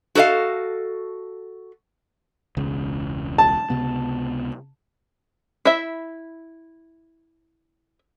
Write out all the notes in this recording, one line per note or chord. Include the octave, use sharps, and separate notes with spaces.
F#4 A4 A#4 D#5 F5
E1 C#2 C#3
A5
C#2 C3 B3
E4 E5